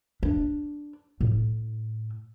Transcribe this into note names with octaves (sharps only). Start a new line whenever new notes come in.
D4
A2